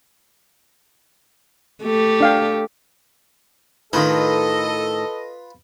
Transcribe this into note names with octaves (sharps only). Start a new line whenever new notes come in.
A3 G4
D4 F5 G5
A2 D#3 F4 A4 B4 D#5